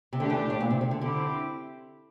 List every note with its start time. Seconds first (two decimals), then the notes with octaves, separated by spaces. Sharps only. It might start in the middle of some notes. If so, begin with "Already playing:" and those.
0.13 C3
0.20 D3 A3 D4 G4
0.30 E3
0.50 A2
0.60 A#2
0.71 C3
0.81 C3
0.91 D3
1.01 D3 C4 E4 G4